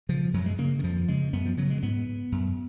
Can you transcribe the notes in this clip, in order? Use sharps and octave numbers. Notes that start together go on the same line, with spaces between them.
C#3 F3
F#2 F#3
G#3
C#3 A#3
D#3
F2 F3
C#3 G#3
F#2 B3
F3
C#3 F#3
G#3
G#2 B3
F#2